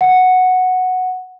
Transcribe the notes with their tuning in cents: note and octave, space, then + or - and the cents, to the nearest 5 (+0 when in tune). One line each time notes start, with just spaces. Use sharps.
F#5 -5